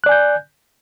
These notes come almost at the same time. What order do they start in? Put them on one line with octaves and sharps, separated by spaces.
F#6 D5 G#5 G6